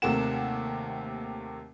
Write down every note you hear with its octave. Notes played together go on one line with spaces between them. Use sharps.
D#2 C3 A3 A#4 F#5 E7